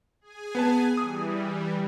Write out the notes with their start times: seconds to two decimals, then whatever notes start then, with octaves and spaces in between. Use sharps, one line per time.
0.21 G#4 G#5
0.55 B3 B4 A5
0.97 E3 G3 D#6